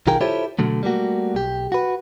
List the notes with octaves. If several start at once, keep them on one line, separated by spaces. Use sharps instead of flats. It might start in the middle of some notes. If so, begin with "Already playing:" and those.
B1 D#3 F4 G#4 A#4 G5
E4 F4 G4 A4 C5 C#5
B2 D3 F#3 A3
G3 A3 A#3 F#4
B1 G4
F#4 B4